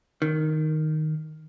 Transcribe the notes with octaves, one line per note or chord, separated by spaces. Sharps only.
D#3